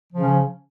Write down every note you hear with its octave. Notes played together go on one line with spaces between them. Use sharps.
C#3 F3 C#4